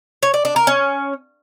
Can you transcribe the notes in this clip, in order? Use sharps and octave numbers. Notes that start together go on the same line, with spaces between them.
C#5
D5
D4
A#4
C#4